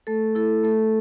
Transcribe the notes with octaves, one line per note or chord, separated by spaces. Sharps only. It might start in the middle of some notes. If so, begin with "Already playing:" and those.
A3 A4
E4 A4
A3 A4